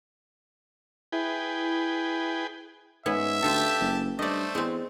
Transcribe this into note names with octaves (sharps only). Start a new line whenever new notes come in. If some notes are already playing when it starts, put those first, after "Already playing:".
E4 G#4 B4 G5
G#2 B3 C#4 E5 G#5
D2 F4 G4 A4 A5
F#1
G2 A3 C5 D5 D#5
E2 G#3 C4